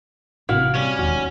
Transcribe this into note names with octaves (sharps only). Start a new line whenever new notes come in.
A1 A2 C3 E4 F#4 F5 G5
G3 C#4 E4
E1 D#2 F#4